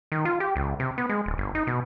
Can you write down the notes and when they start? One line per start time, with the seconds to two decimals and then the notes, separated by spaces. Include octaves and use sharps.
0.12 D#3
0.25 F4
0.40 G4
0.56 C#2
0.80 C3
0.98 B3
1.09 G#3
1.26 D1
1.38 G1
1.55 D#4
1.67 B2